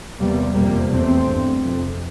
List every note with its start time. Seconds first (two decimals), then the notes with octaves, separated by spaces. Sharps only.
0.19 E2 C3 G3 A#3
0.54 F2 C3 G3 A#3
0.90 E2 C3 A3 C4
1.26 G2
1.62 F2 C3